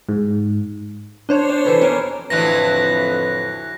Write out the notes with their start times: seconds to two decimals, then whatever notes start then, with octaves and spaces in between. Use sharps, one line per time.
0.09 G#2
1.29 D4 C5 C#5
1.49 D5
1.65 E3 A4 B4
1.81 F2 C#4 A#4
2.30 F2 A2 D3 E3 F#3 B4 F#6 A#6